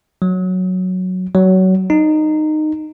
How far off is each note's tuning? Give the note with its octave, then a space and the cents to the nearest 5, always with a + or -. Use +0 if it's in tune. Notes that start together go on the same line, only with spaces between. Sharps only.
F#3 -5
F#3 +20
D#4 -15